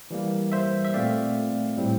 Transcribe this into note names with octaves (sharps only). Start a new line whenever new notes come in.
E3 G3 A#3
C5 E5
E5
A#2 A3 C4 D5 F5
A2 G3 C4